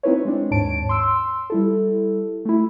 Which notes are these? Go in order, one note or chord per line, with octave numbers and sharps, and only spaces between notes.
C4 D#4 E4 B4 C#5
G#3 C4 D4
D#2 G#2 C#5 A5 D7
C6 E6
G3 E4 A4
A3 E4